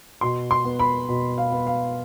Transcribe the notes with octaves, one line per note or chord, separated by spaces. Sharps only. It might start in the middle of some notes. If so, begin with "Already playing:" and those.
B2 C6
C6
B3
B5
B2
F5
B3
F5